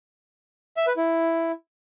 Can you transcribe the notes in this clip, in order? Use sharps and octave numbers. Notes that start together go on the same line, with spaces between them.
E5
B4
E4